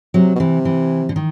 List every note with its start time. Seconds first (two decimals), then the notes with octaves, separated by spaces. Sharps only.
0.14 C3 F#3
0.36 B2
0.40 C3 E3
0.65 E3
1.09 D3
1.16 D#3